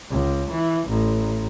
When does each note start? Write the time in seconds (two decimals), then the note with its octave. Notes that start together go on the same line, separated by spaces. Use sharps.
0.11 C#2
0.51 E3
0.89 A1